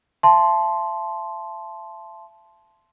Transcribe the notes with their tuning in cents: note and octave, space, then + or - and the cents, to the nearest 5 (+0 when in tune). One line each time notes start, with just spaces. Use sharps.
E5 +35 A5 -15 C6 +0